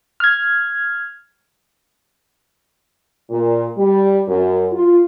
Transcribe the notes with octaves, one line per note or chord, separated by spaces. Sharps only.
F6 G#6
A#2
G3
F#2
F4